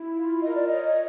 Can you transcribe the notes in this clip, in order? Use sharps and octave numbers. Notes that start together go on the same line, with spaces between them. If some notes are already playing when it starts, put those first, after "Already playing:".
Already playing: E4
F4
A#4 D#5
D5
C#5 D#5